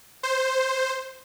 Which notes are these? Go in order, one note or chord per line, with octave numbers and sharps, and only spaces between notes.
C5